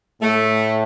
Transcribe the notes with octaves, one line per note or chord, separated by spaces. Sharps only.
A2 A3